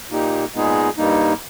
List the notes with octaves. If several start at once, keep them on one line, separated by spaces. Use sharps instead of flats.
A#2 A#3 D#4 G4
A#2 G#3 B3 D#4 G#4
G2 G3 A#3 D#4